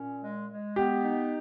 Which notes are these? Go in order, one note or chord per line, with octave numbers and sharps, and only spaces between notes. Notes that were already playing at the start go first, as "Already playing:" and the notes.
Already playing: A#2 C#4
G#3
G#3
B3 G4
D#4